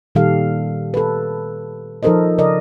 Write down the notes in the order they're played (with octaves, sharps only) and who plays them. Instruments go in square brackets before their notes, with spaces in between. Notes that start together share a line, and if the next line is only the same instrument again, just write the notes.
[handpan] A#2 D#3 G3 G4 A4 F5
A4 B4
F3 D#4 A4 A#4 C5 D#5
C#3 A#4 D5 D#5